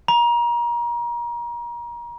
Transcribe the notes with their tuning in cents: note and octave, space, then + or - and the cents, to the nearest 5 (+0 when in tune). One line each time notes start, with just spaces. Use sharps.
A#5 +30